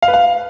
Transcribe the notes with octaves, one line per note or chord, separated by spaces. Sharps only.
F5
B4
F5